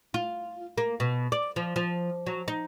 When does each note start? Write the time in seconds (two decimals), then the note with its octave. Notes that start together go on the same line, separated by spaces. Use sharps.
0.14 F4
0.78 A#3
1.00 B2
1.32 D5
1.56 F3
1.76 F3
2.26 F#3
2.48 D#4